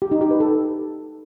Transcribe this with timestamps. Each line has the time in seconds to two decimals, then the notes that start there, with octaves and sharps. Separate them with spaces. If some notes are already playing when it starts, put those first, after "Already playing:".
0.02 G4
0.11 D#4
0.21 G4
0.31 B4
0.40 A4